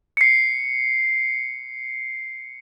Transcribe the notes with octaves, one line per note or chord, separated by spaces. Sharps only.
C7 C#7